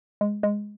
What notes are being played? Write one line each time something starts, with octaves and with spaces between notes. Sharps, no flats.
G#3
G#3